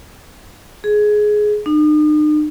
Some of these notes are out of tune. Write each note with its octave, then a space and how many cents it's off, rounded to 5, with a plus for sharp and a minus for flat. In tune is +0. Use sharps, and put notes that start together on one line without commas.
G#4 +15
D#4 -45